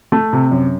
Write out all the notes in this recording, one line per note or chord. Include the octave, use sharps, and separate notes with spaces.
A3
C3
F#2